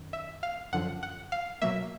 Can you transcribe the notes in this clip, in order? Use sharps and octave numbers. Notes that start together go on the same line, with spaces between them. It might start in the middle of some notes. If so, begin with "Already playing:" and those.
Already playing: F#2 D#3
E5
F5
F#2 D3 F3 F#5
F#5
F5
B2 F#3 A#3 E5